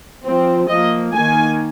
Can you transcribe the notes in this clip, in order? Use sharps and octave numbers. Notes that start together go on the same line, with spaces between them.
F3 C4
F3 A#3 D#5
D#3 A#3 G#5